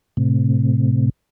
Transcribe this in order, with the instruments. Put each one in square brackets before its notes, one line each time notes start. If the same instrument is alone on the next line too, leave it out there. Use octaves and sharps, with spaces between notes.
[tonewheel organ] A2 C3